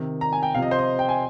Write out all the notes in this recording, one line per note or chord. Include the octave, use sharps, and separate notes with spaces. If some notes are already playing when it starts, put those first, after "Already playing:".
Already playing: C3 D#3
A#5
G#5
G5
C3 F3 D#5 F5
C5
D#5
G5
G#5